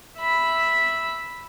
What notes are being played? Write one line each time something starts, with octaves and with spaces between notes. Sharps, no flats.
E5 B5